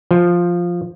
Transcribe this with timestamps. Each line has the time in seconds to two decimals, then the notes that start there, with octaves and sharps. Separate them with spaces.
0.11 F3